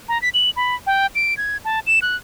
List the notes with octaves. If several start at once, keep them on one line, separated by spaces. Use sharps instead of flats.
A#5
B6
F#7
B5
G5
D7
G#6
A5
E7
F#6